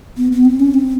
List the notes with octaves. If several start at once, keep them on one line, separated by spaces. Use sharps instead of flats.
B3
B3
C4
C#4
C4